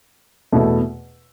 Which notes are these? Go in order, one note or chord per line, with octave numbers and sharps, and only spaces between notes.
E2 B2 A3 E4